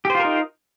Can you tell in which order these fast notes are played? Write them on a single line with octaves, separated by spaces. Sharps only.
G4 C5 F4 A#4 D#4